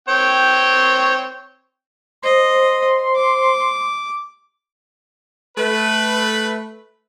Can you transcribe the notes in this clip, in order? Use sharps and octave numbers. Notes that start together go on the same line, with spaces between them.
C4 C#5 G5
C5 D#5 C6
D6
A3 B4